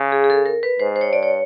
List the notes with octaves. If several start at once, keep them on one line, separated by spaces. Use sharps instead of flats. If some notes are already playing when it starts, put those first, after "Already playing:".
Already playing: C#3
G#4
G#4
A4
A#4
B4
G#2 C5
C5
C#5
G2 D5
C#5